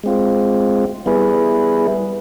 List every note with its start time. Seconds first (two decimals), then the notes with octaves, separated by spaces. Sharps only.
0.03 G#3 C4 F4
1.06 G3 B3 E4 G#4 B4